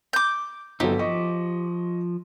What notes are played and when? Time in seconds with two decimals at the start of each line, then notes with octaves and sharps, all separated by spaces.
0.13 D6 G6
0.80 G1 F3 F#3 C4 D#4 G4 A4
0.99 F3 D#5 C#6